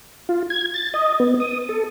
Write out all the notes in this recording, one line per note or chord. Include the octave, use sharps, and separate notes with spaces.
F4
G#6
A6
D#5
B3
D#6
A4